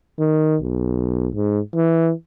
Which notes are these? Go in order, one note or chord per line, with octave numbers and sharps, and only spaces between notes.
D#3
B1
G#2
E3